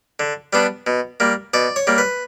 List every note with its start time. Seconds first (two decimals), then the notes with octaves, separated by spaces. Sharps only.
0.20 D3
0.53 G3 B3 D4
0.87 B2
1.20 G3 A#3
1.54 B2 D5
1.76 C#5
1.87 G3 A#3
1.98 B4